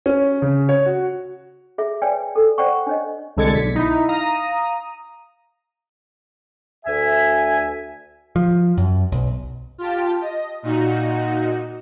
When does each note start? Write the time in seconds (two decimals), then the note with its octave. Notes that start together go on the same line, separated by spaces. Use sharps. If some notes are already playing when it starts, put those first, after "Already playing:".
0.06 C#4
0.42 C#3
0.69 C#5
0.86 F#4
1.78 G#4 E5
2.02 B4 C#5 D5 G5 G#5
2.36 A4
2.58 C5 D5 F#5 G5 C#6
2.87 D4 C#5 D#5
3.37 C2 D3 G#3 G#6 A6 C#7
3.55 B1 B6
3.75 D#4 E4
4.08 F5 A#5 D#6
6.85 D2 E5 G#5
8.36 F3
8.78 F#2
9.12 B1
9.78 F4 G4 A5
10.21 D#5
10.63 A#2 D#4 F#4